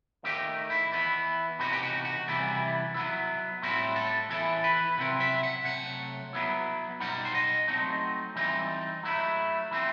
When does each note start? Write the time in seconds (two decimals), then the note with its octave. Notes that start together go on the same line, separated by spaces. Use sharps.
0.24 D#3 A3 D#4 G4
0.70 E4
0.92 E3 B3 E4
1.59 C3 E3 B3 D#4 F#4
1.73 G4
1.83 F#4
2.05 F#4
2.28 C3 E3 G3 B3 E4
2.94 F#3 B3 E4
3.62 A2 G3 C4 E4 F#4
3.96 A4
4.30 E3 B3 E4 A4
4.64 B4
4.97 C3 F#3 C4 E4
5.20 E5
5.43 F#5
5.65 C3 F#3 A3 F#5
6.33 F#3 B3 E4
7.00 B2 G3 D#4 F#5
7.25 C5
7.35 D#5
7.68 F#3 A3 C4 D#4
8.36 E3 G3 C4 D#4
9.03 F#3 A3 E4
9.71 E3 A3 C4